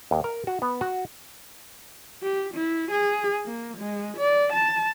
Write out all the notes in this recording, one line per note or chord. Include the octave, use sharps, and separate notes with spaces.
D#2
A#4
F#4
B3
F#4
G4
E4
G#4
A#3
G#3
D5
A5